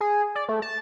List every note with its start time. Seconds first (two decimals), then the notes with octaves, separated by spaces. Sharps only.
0.01 G#4
0.35 D5
0.48 A3
0.62 A5